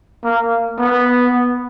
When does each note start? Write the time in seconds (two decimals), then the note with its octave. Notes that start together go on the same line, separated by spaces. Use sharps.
0.23 A#3
0.79 B3